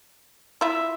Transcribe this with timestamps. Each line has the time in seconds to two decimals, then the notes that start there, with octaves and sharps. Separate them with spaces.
0.61 E4 F4 E5